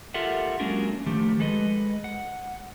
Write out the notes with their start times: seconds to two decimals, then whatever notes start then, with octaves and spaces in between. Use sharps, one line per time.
0.14 F4 G4 A4 A#4 E5 F#5
0.60 F#3 G#3 A#3 C#4 D4 A#4
1.06 D#3 F3 A3 G4
1.40 G#3 A4 B4 D#5
2.04 F#5